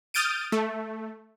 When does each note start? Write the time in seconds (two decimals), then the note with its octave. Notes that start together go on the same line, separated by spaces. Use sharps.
0.14 D#6 F6 G6 A6 D7 D#7
0.52 A3